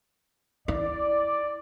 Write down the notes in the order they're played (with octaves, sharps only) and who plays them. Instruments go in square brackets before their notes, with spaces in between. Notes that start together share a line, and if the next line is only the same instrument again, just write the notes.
[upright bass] E4 [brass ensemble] D5